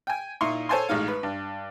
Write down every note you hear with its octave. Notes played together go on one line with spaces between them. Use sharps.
G5 G#5
A#2 D#4 E4 C6 C#6
A4 C5 C#5 G#5 A5 C6
A1 G#3 D#4 F5
B4
G2